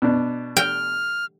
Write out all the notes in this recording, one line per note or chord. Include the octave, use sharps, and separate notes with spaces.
B2 D4
G5 F6